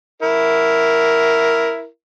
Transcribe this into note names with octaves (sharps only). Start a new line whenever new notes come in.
E4 A#4